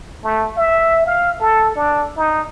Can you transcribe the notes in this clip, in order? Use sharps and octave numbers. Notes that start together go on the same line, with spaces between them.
A3
E5
F5
A4
D4
D#4